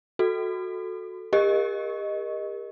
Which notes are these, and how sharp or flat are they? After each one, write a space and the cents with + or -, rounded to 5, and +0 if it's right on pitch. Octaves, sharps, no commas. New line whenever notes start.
F#4 -10 A4 +0
G4 +40 A#4 +10 D#5 -5